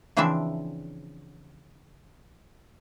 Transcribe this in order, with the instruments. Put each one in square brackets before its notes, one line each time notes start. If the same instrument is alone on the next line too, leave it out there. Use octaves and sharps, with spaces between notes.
[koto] C#3 E3 F3 C4 D4 E5